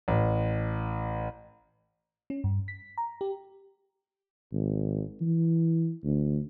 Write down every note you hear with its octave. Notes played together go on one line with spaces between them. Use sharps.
A1
C#4
G2
B6
A#5
G4
G#1
E3
D2